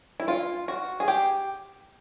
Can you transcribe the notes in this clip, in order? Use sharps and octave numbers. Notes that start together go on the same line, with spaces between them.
E4
F4
F#4
G#4
G4